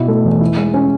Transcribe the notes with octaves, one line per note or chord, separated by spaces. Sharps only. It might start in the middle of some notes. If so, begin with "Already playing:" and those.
Already playing: B2 E4
A3
E2
E4
G#3
C#4